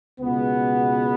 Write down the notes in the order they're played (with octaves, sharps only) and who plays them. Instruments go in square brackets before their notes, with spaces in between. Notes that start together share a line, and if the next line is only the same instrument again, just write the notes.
[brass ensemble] C#2 B2 G#3 B3